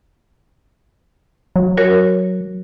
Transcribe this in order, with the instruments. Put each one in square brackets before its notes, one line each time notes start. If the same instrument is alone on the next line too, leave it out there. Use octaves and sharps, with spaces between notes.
[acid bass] F#3
[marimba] F#4 A#4 C#5